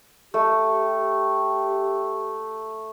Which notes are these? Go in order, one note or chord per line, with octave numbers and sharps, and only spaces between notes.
A3 G4